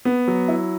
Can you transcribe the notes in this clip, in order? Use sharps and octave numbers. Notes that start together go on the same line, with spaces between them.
B3
F#3
E4